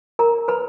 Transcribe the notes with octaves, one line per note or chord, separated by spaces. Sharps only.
A#4 A#5
B4 B5